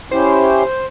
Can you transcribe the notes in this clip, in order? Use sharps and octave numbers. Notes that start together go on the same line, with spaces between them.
C#4 E4 G4 C5